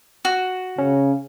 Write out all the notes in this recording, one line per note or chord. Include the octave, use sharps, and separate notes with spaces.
F#4
C#3 C#4